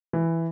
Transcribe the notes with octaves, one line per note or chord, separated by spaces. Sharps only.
E3